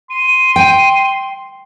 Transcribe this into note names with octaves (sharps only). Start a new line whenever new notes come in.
C6 D#7
G5